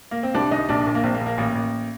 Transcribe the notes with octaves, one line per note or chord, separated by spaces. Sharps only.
A#3
C4
C2 D4
C2 D#4
A#1 D4
A#1
A#3
A#1 C4
A#3
A#1
A#3
A1 A#3
A1